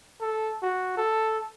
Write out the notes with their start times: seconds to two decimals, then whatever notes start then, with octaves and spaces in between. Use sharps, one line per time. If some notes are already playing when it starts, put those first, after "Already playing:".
0.21 A4
0.62 F#4
0.97 A4